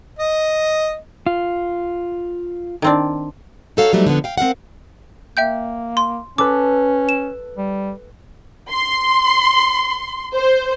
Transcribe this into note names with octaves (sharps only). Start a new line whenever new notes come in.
D#5
F4
D#3 C4 D4
D#4 F#4 A4 C#5 F5
F2 F#3 G3 A3 D#4
D3 F3 B3
F5 G5
C4 A#4 F5 F#5
A#3 E5 G5 G6
C6
C#4 A4 B4 D6
E7
G3
C6
C5